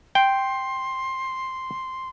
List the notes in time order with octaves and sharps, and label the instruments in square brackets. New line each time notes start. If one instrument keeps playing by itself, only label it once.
[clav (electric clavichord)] G5 [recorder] C6